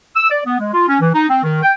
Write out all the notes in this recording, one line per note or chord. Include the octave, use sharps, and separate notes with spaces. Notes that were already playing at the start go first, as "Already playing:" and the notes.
E6
D5
B3
G#3
F4
C#4
E3
D#4
C4
D#3
G5